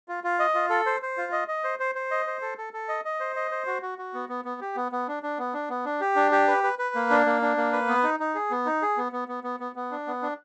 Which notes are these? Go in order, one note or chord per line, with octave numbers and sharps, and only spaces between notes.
F4
F4
D#5
F4
A4
C5
C5
F4
D#5
D#5
C5
C5
C5
D#5
C5
A4
A4
A4
D#5
D#5
C5
D#5
C5
F#4
F#4
F#4
B3
B3
B3
G4
B3
B3
D4
D4
B3
D4
B3
D4
G4
D4
G4
B4
B4
B4
A#3
D4
A#3
D4
A#3
B4
B3
D#4
D#4
G#4
B3
D#4
G#4
B3
B3
B3
B3
B3
B3
D4
B3
D4